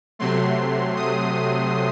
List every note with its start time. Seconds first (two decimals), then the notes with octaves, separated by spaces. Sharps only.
0.19 C3 F#3 A3 C6
0.96 D#6